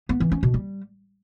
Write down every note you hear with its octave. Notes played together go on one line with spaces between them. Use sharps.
B3
E3
C#4
B2
G3